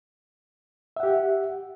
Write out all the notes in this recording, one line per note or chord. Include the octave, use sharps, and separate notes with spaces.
G4 E5 F#5